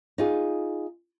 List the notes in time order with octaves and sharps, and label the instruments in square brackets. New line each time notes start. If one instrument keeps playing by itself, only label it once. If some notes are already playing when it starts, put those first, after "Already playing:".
[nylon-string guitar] D#4 F4 G#4